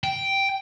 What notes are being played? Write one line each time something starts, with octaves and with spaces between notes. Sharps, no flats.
G5